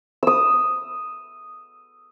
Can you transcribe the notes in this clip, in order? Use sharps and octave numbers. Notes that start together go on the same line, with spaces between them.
D#6 E6